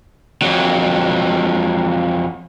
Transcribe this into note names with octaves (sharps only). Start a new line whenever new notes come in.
F2 F#3